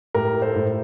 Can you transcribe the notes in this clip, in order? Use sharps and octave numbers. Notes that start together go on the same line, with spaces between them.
A2 G4 A#4
A4 C5
A2